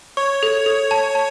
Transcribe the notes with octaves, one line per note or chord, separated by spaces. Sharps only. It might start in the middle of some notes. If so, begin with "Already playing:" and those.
C#5 C#6
A4
A4
A5
A5